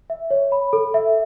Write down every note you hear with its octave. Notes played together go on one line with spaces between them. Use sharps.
E5
C#5
B5
A4
E5